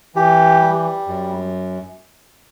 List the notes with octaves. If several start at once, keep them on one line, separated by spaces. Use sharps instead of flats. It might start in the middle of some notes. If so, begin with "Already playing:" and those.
E3 G4
G3
F#2